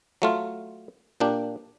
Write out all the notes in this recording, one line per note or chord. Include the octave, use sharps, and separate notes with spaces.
F#3 A3 F4
A#2 A#3 D4 G4